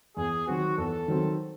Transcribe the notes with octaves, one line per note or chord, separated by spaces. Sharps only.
E2 G#4
D#3 F#3 C4 F#4
E2 A4
D#3 F#3 C4